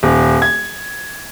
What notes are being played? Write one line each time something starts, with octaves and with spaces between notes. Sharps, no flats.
D#1
G#6